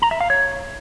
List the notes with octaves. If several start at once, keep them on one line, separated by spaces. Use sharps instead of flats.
A#5
E5
F5
C#5